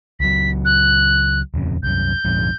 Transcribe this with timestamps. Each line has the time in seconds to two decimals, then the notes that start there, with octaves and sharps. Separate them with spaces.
0.20 C#2 F#3 B6
0.65 F#6
1.54 D#1 F2 C#3
1.83 C2 F#2 G6
2.25 A#1 F2 G#2